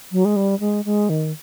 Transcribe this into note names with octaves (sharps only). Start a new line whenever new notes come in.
F#3
G#3
G3
G#3
G#3
D#3